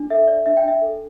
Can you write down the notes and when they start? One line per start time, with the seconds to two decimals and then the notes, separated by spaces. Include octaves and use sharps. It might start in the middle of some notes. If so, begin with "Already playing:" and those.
Already playing: D4
0.10 A4 E5
0.28 D5
0.46 D4 E5
0.57 G5
0.63 D4 E5
0.82 A4